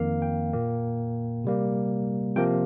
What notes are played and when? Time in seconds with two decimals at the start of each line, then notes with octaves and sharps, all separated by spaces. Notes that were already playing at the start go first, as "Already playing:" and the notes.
Already playing: F2 D#3 A#3 F5
0.22 G5
0.53 A#2 A#3
1.44 C3 G3 A#3
2.36 C3 F3 A#3 G5